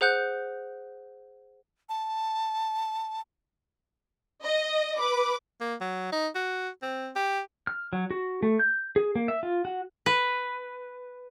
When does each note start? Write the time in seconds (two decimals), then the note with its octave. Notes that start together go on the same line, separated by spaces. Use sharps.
0.01 G#4 C5 F#5 F#6 G6
1.89 A5
4.43 D#5
4.98 B4 D6
5.61 A#3
5.81 F#3
6.12 D#4
6.35 F#4
6.82 C4
7.16 G4
7.67 F6
7.93 F#3
8.11 F#4
8.43 A3
8.59 G6
8.96 G#4
9.16 A#3
9.28 E5
9.43 F4
9.65 F#4
10.06 B4